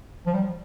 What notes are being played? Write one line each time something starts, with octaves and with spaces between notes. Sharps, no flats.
F3
G3